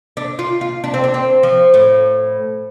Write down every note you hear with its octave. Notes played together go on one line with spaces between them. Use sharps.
D4
F4
F4
D4
C4
D4
C4
F3
A2